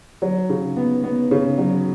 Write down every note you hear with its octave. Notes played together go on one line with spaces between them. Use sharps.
F#3
C#3
B3
B3
C#3
F#3